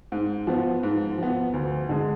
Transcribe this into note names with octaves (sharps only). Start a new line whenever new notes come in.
G#2
F3 B3
G#2
F3 B3
D2
D3 G#3